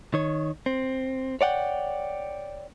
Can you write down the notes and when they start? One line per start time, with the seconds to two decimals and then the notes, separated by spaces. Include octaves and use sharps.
0.14 D#3 C#5
0.66 C4
1.41 C#5 D5 F#5 G5